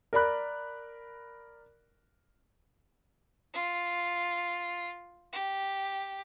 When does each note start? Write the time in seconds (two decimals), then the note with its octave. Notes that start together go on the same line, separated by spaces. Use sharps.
0.13 A#4 D5 B5 F#6
3.54 F4
5.33 G4